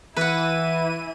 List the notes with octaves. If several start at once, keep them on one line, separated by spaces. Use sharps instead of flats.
E3 E4 B4 F#5 D#7